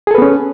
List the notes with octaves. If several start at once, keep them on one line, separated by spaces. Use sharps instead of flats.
B3 C#4 G#4 A4 B4